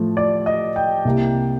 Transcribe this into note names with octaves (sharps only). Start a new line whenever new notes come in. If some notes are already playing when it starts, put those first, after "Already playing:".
Already playing: A2 F3 A3
D5
D#5
G5
C2 C3 G3 A#3